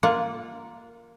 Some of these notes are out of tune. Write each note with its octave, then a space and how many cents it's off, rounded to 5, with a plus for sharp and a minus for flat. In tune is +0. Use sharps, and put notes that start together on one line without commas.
A#3 +0 F4 +0 F#5 -30